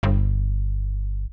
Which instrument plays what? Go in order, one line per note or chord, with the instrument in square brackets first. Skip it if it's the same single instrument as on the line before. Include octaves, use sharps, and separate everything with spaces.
[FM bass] G1